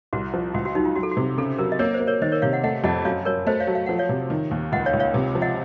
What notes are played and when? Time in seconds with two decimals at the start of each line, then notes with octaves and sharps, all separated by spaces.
0.13 C2 F#4
0.34 F3
0.54 C#2 F#4
0.65 F#4
0.75 F#3 D#4
0.85 F4
0.96 F#3 F#4
1.03 A4
1.11 F#4
1.17 C3
1.38 C#3 A4
1.59 F#3 A#4
1.72 D#5
1.79 A#3 A#4 C#5
1.94 C5
2.00 A#3
2.07 A#4 C#5
2.22 D#3 C5 D#5
2.32 A#4 C#5
2.42 C3 C#5 F5
2.53 D#5 F#5
2.64 A3 D#5 F#5
2.84 F2 D#5 F#5
3.05 F#2 C#5 F5
3.25 F#2 A#4 C#5
3.47 A3 C5 D#5
3.60 C#5 F5
3.67 F#3
3.75 F5
3.86 F3 F#5
3.99 C#5 F5
4.09 C3
4.30 D#3
4.51 D#2
4.72 C#2 D#5 F#5
4.86 C#5 F5
4.93 C#2
5.00 C#5 F5
5.14 C3
5.35 F3
5.42 D#5 F#5